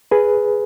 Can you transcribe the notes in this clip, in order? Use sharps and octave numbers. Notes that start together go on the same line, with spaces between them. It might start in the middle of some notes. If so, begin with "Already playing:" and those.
G#4 B4